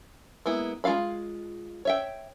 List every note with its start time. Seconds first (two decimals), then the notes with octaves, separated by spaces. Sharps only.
0.46 G#3 A#3 B3 E4
0.84 G#3 F4 E5 F5 B5
1.85 C#5 E5 G5